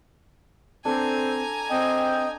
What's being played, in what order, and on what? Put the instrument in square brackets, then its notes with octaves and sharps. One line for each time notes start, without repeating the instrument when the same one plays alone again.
[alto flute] C4 [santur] D4 A4 [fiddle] G#5 A#5
[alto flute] C4 [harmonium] D#5 G5